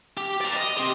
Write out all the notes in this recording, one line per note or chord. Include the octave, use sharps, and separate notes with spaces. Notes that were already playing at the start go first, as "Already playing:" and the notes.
G4
D5 A#5
D#5
C4 G4